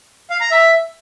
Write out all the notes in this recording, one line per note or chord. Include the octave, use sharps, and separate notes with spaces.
F5
A#5
E5